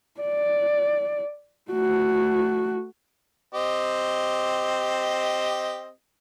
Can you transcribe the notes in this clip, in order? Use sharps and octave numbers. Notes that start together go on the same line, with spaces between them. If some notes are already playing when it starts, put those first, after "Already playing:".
D5
A3 F#4
C4 G4 D#5